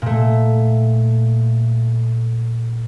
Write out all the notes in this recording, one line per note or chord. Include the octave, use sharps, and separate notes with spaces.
A#2 A3